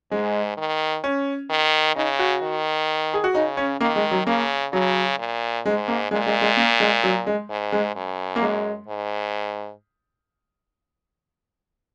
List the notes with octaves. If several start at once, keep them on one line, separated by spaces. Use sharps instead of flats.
G#2 G#3
D#3
C#4
D#3
C#3 D#4
F#4
D#3
G#4
F#4
C#3 D#4
C#4
D#3 A#3
G#3
F#3
C#3 A#3
C#3 F#3
A#2
G#2 G#3
A#3
A#2 G#3
G#3
G#3
A#3
G#3
F#3
G#3
G#2
G#3
F#2
A#3
G#3
G#2